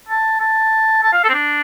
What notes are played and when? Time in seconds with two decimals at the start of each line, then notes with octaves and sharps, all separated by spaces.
0.09 A5
0.40 A5
1.03 A5
1.13 F5
1.24 A4
1.29 C4
1.34 D4